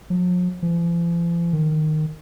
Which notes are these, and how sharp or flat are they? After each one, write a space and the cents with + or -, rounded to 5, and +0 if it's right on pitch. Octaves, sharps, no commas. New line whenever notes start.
F3 +45
F3 -45
D#3 -10